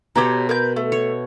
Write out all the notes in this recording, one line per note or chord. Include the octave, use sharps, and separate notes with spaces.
B2 G4 A4 C5 C#5 A#5
A#4 B4 G6
A3
C#5